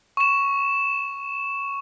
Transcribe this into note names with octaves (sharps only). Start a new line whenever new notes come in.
C#6 E7